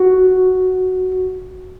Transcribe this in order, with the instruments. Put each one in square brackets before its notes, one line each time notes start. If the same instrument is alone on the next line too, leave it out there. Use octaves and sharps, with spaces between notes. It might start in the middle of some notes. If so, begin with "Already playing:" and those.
Already playing: [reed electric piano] F#4